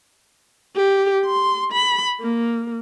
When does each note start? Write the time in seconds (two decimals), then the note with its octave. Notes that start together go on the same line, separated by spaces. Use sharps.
0.76 G4
1.26 C6
1.72 B5
2.21 A#3